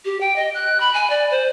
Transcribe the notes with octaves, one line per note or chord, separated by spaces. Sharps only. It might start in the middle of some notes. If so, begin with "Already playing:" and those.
G4
G5
D#5
F#6
B5
G#5
D5
C5